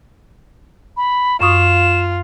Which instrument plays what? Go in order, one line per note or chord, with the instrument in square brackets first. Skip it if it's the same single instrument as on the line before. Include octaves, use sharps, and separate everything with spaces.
[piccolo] B5
[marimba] F#2 C#6 D#6 [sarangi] F4 [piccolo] E7